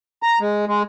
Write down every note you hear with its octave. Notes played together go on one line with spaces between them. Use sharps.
A#5
G#3
G#3